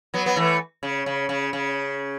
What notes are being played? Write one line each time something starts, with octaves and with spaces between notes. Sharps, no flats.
F#3 B3
B3
E3 A3
C#3
C#3
C#3
C#3